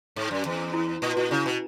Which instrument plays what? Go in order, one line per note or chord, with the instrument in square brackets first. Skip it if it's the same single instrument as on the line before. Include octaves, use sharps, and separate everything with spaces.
[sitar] G#2
F#2
E2
[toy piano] E4
[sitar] A#2
[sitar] A#2 [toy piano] F#4
[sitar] C#3 [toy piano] E4
[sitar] B2